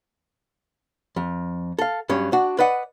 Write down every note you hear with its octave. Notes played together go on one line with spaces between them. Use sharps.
F2
A4 F5
G2 F#3 C#4
D4 F#4
B4 D5 D#5 F#5